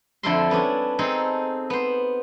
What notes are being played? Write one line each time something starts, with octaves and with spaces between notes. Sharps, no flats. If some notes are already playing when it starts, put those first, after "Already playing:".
F2 D3 E4 A4 E5 C6
G3 B3 C#4 D4
C4 D#4 G#4 A4
B3 C5